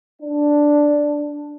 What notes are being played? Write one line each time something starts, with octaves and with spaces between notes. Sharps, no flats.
D4